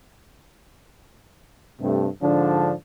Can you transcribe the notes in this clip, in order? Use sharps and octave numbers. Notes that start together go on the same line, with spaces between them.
G2 C3 A3
G#2 D3 F3 D4